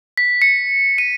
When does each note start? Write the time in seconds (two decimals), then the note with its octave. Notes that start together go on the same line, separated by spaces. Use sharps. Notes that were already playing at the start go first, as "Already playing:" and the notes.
0.18 B6
0.42 C#7
0.98 D#7